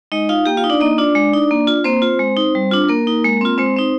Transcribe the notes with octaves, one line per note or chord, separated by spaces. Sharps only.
G#3 D#4 D#5
D#4 F4 F5
A#3 G4 G5
F4 F5
D#4
D4 D5
A#3 D#4 D#5
D4 F4 D5
G#3
D#4
A#3
F4
A#3 C4 C5
F4
G#3
D#4
G3
D4 F4
A#3 A#4
D#4
G#3
C4 F4
G#3 C4 C5
C4 D#4